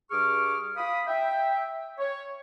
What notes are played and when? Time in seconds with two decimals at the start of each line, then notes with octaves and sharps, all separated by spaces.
0.11 G2 G#4 C#6 D6 F6
0.77 F5 B5 D#6
1.07 E5 G5
1.98 C#5